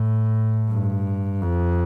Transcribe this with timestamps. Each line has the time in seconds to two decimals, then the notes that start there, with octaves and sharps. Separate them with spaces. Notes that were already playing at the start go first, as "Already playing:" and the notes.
Already playing: A2
0.70 G2
1.42 F2